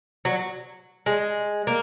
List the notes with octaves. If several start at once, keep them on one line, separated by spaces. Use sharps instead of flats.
F#3
G#3
A#3